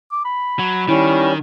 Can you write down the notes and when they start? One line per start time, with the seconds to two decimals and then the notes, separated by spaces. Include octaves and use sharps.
0.12 D6
0.25 B5
0.59 F#3
0.89 D#3 G3 C#4 E4